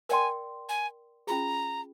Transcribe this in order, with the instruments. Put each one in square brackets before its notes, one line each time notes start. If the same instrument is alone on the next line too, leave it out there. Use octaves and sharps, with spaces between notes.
[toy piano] A#4 D5 G5 C6 [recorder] G#5
[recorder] G#5
[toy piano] C#4 F4 G#4 [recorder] A#5